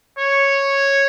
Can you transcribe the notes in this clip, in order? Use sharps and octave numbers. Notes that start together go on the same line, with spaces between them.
C#5